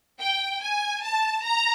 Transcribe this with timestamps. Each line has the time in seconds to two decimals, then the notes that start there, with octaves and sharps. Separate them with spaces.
0.20 G5
0.62 G#5
1.03 A5
1.44 A#5